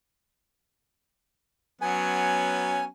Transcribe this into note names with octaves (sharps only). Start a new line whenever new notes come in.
F#3 B3 C#4 G#5